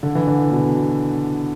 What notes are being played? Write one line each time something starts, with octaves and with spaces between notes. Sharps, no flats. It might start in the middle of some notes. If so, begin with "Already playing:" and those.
D3
E3
D3
B2